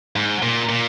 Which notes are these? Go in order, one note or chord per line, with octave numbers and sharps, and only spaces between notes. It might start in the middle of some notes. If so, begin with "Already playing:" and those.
G#2
A#2
A#2